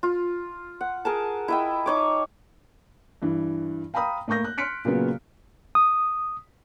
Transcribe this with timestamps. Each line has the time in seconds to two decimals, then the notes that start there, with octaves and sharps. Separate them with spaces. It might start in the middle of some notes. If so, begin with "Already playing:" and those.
0.03 F4
0.81 F#5
1.05 G#4 A#4 A5
1.48 E4 D#5 G5
1.86 D#4 C#5 D6
3.22 G2 E3
3.94 F5 G5 A#5 B5 D#6
4.28 A2 A#3 C#6 G6 A#6
4.44 F#6
4.58 C6 F6 F#6 B6 C#7 D7
4.85 A#2 C#3 F#3 B3
5.75 D#6